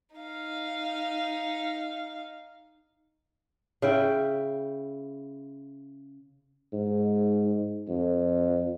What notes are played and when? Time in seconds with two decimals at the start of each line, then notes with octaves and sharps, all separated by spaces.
0.16 D#4 F5
3.82 C#3 E4 G5
6.73 G#2
7.88 F2